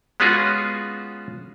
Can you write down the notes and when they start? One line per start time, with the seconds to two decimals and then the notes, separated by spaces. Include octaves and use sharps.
0.20 G#3 B3 C#4 F4 F#4 G#4